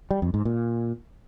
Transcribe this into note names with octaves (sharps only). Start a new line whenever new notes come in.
G3
F2
G#2
A#2